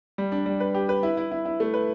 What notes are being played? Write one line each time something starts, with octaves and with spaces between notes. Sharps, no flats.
G3
D4
G3
B4
G4
B4
E4
E4
E4
E4
A3
B4